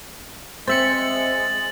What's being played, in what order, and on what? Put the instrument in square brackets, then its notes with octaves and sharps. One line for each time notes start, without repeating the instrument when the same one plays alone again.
[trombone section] G#3 [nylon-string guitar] C4 [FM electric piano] C5 E5 C#7 [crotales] A6 F#7